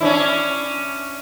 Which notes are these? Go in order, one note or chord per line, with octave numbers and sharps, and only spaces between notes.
C#4 D4 E4